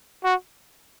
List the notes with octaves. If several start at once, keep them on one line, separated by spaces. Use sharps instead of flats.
F#4